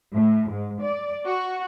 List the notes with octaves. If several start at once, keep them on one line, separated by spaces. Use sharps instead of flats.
A2
G#2
D5
F#4